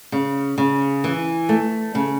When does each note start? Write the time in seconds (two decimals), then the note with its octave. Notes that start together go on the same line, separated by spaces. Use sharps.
0.12 C#3
0.58 C#3
1.04 E3
1.49 A3
1.95 C#3